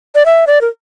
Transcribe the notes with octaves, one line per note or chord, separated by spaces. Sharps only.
D5
E5
D5
A#4